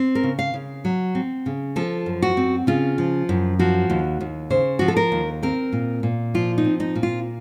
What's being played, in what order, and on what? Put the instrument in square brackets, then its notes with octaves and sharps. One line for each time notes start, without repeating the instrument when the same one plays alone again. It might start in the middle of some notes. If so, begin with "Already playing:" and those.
Already playing: [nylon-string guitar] C4
A#4
C#3
F5
C#3
F#3
C4
C#3
F3 A4
F#2
F#4
C4
C#3 F4
F3
F#2
F3 F#4
D#2
D#2
C#3 C5
F3 F#4
A4
A#4
D#2
C4 A#4
A#2
A#2
F3 F4
D#4
C4
D#4
A#2
F4